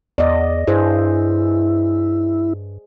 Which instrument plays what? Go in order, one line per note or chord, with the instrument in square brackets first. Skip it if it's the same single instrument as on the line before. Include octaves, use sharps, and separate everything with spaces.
[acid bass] E2 [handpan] D5 D#5
[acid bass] G2 [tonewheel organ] E4 [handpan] G#4 C5